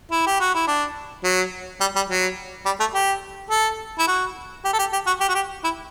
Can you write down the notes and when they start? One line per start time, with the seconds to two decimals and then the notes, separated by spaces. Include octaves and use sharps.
0.11 E4
0.26 G4
0.40 F#4
0.54 E4
0.67 D4
1.24 F#3
1.80 G3
1.95 G3
2.09 F#3
2.65 G3
2.80 A3
2.94 G4
3.50 A4
3.98 E4
4.07 F#4
4.65 G4
4.73 A4
4.79 G4
4.92 G4
5.06 F#4
5.20 G4
5.29 F#4
5.35 G4
5.64 E4